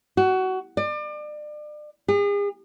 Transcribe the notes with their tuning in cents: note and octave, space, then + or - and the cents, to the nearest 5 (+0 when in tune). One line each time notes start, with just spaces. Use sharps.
F#4 +20
D5 +35
G#4 -40